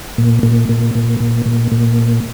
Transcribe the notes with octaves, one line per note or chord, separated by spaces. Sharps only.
A#2
A#2
A#2
A#2
A#2
A#2
A#2